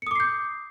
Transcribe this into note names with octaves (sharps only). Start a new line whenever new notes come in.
D6 D#6 G6 C7 C#7